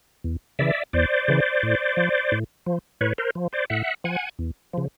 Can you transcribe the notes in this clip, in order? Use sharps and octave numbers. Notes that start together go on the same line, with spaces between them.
E2
C#3 E3 D5 E5
E2 C5 D5
C#3 E3
A2
F3
A2
F3
A2 B4 C#5
A#4 C5
F3
C5 D5
A2 E5 F#5
F3 F#5 G#5
E2
C#3 F3